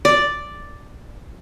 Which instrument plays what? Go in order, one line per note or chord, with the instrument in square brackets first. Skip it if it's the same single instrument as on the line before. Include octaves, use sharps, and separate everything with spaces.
[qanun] D5